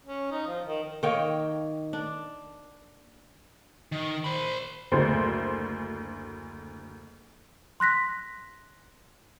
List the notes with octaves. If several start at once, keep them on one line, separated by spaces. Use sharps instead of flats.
C#4
D#4
F3
D#3
D#3 A#3 C#5 G5
D4
D#3
C5 B5
F#1 D2 C5
C6 F#6 A#6 B6